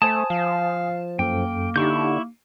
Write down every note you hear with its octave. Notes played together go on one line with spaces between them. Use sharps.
A3 C5 G#5 A5 D#6
F3 F5
F#2 A#3 A4 G5
D3 D#4 E4 G4 C#6 G6